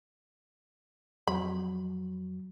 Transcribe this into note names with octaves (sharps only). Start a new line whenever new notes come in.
F2 F#3 B5